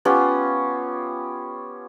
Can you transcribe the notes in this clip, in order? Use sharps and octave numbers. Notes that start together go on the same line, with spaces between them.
B3 C#4 F4 G4